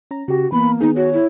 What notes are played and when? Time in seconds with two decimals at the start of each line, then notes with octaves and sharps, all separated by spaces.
0.11 C#4 A#5
0.28 C#3 F#4 G4
0.52 E3 A#3 B3 B5
0.80 D#3 B3 D#4 G#4
0.96 F#4 C#5
1.13 E4